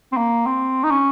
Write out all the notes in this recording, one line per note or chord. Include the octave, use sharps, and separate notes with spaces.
C4
A#3
C4
D#4
C#4